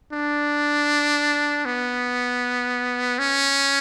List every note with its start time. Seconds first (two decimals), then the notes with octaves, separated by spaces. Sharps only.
0.13 D4
1.66 B3
3.19 C#4